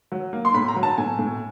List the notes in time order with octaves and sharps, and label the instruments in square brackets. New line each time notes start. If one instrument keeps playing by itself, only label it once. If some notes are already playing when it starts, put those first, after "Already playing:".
[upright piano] F#3
A#3
C6
A2 B5
A#5
F#3
A5
A2 G#5
A2